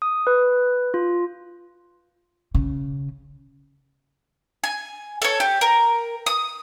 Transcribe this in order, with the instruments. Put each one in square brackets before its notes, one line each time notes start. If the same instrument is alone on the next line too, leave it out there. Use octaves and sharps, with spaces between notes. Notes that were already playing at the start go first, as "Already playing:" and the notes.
[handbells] D#6
B4
F4
[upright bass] C#3
[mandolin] G#5
A4 C#5
G4
A#4
D#6